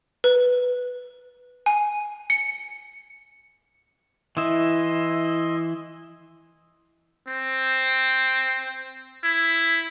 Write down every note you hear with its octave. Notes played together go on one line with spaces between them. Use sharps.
B4
G#5
C#7
E3 E4 D#5 C6
C4
E4